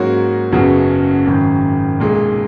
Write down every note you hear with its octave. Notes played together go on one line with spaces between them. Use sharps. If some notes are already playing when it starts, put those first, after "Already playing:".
Already playing: G#2 F#3 A#3 C#4 F#4
F#1 F#2 C#3 F#3 B3
G#1 F#2 D#3
B1 A#2 G#3